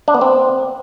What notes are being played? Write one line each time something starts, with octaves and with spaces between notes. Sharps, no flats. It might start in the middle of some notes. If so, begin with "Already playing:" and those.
D4
B3
C4